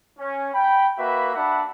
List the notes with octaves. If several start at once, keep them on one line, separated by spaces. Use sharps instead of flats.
C#4
G5 B5
A#3 F#4 B4 E5 B5
D4 E5 F#5 B5